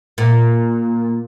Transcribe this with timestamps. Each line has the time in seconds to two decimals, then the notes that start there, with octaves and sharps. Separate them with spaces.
0.18 A#2